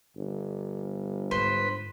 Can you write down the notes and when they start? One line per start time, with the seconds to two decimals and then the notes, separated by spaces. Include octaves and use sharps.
0.17 G1
1.31 G#2 B4 C5